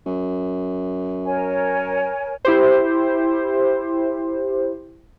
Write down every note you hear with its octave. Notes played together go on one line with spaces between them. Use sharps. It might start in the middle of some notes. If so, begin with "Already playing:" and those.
F#2
A#4 C#5 G#5
E4 G4 C5